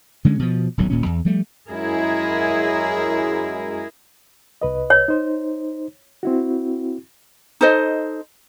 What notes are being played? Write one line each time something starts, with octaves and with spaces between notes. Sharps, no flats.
D3 G#3 A3 C#4
B2 F3
D#1 B1 A2 F#3
D#1 A#2 C#4
E2
F3 G3 A3
F#2 G#3 E4 G#4 A#4
C2 B4 D#5
C#5
D#4 C5
C4 E4 F#4
D#4 A4 C5 D#5